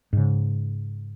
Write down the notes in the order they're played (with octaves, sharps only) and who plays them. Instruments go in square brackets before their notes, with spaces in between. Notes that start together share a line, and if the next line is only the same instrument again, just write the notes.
[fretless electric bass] G#2 C#3